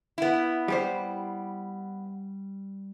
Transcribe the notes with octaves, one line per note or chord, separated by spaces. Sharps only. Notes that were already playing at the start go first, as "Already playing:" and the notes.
B3 E4
G3 G4 C5